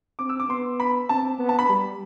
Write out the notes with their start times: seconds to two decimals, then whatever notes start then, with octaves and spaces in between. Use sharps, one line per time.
0.19 C4 D6
0.29 E6
0.40 D6
0.49 B3 C6
0.80 B5
1.09 C4 A5
1.38 B3
1.49 A5
1.59 B5
1.69 G3